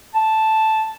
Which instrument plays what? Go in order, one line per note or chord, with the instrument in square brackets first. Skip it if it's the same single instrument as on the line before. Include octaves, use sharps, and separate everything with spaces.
[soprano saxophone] A5